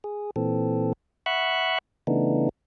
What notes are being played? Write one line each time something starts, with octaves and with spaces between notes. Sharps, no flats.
G#4
A#2 E3 C4 A4
E5 F#5 B5 C#6 E6 F#6
C#3 E3 A3 B3 D4 D#4